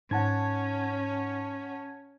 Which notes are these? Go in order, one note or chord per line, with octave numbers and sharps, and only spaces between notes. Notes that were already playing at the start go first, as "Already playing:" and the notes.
G#2 C#4 F#5 A5 G#6